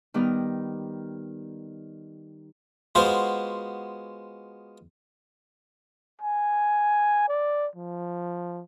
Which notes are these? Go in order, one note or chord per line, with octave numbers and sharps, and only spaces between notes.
D#3 G3 B3 D#6 F6
G#3 B3 F4 F#4 C5
G#5
D5
F3